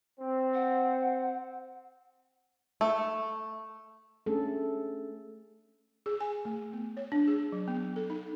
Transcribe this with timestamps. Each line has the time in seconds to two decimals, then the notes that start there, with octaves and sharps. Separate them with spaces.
0.19 C4
0.53 F#5
2.81 A3
4.26 A3 C#4 D4 G#4 A4
6.06 G#4
6.21 G#5
6.45 A3
6.73 B3
6.97 C#5
7.12 D4
7.27 G#4
7.52 F#3
7.68 B3
7.96 A4
8.10 D#4